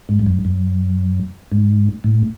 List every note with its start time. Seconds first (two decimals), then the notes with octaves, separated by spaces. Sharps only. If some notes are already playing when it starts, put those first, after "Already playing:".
0.09 G#2
0.19 G2
0.26 F#2
0.45 F#2
1.52 G#2
2.04 A2